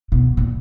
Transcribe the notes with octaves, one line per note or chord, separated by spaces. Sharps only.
B2
A#2